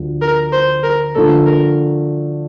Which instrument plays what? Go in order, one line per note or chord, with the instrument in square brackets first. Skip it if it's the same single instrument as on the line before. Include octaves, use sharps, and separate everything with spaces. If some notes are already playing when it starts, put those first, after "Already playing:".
Already playing: [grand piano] D2 D3 F3
[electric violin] A#4
C5
A#4
[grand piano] D3 F3 A3 D4 [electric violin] A4
[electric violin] A#4